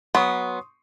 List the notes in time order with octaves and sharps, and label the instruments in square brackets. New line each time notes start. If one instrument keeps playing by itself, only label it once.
[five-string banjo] F#3 B3 [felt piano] C6 C#6 D#6